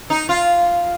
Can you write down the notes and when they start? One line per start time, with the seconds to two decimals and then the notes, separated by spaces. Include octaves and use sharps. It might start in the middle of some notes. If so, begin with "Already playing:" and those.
0.10 D#4
0.29 F4